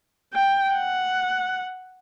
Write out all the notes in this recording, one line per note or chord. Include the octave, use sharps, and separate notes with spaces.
G5
F#5